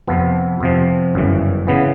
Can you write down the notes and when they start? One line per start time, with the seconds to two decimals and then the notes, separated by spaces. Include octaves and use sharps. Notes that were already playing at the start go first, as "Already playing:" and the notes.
0.07 F2 C3 F3 B3
0.60 F2 C3 F3
1.15 G1 F#2 C#3 E3
1.67 C#3 E3 B3